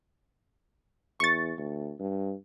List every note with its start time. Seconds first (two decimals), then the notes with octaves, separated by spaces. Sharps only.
1.20 E2 C#6 A6
1.57 D2
1.99 G2